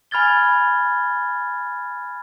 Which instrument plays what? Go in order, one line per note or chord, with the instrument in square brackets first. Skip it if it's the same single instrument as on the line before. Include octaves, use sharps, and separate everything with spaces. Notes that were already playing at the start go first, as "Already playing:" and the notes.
[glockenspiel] G#5 B5 F6 G#6 A6 G7